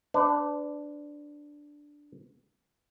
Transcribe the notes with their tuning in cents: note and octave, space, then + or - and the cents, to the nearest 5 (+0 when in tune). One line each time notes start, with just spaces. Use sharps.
D4 +0 B4 +40